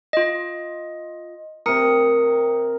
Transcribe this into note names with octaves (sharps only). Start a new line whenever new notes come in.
F4 D#5
C3 A#4 D#6 C#7